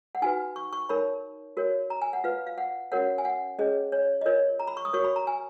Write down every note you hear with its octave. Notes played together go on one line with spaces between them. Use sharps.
F#5
D#4 F#4 B4 G#5
C#6
C#6
D#4 A#4 C#5 B5
F#4 A#4 C#5
A#5
G#5
F#5
F4 B4 F5
F5
F#5
C#4 F#4 A#4 C#5 F#5
G#5
F#5
C#4 G#4 C#5 D#5
C#5
D#5
F4 A#4 C#5
A#5
B5
C#6
D#6
F#4 A#4 C#5 C#6
B5
A#5
G#5